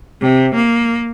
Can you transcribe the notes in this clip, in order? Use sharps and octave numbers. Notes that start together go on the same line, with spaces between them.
C3
A#3